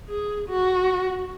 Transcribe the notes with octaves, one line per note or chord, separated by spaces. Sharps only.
G#4
F#4